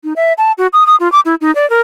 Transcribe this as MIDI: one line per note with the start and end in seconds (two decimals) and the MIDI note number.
0.04 0.13 63
0.16 0.33 76
0.38 0.52 81
0.58 0.67 66
0.73 0.86 87
0.86 0.96 87
1.00 1.10 65
1.12 1.20 86
1.25 1.35 64
1.41 1.53 63
1.55 1.68 74
1.70 1.81 70